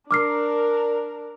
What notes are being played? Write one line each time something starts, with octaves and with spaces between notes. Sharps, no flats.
D4 A#4 D6 F6 C7